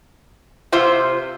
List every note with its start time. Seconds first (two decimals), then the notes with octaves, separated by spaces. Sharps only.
0.72 C3 F4 C5 E5